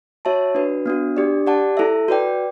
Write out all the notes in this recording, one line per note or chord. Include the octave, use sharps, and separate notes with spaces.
F#4 C#5 E5 A5
D4 F#4 B4
B3 D4 F#4
D4 G4 D5
G4 D5 F#5 A5
E4 A4 E5
F#4 B4 D5 G5